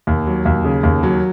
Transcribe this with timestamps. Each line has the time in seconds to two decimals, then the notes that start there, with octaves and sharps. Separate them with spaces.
0.07 D#2
0.27 F#3
0.45 D#2
0.64 C#3
0.83 D#2
1.03 F#3